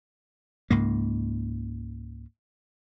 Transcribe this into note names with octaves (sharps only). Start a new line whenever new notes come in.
C#2 G#2 A#3